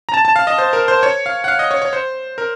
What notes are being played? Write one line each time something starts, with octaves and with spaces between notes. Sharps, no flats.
A#5
A5
A5
F5
D#5
C5
A#4
C5
C#5
F5
F#5
F5
D#5
C#5
C#5
C5
A#4